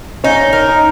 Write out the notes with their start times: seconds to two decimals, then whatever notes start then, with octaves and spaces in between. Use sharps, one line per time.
0.24 C#4 D#4
0.53 A#4
0.68 D#4